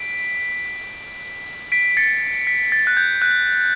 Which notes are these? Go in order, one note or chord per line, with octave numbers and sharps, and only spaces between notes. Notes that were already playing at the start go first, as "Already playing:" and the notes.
Already playing: B6 D7
B6 D7
A6 C#7
B6
A6
F#6
G6
F#6